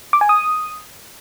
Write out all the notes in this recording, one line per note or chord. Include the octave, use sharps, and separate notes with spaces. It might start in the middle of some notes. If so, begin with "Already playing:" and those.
D6
G#5
D#6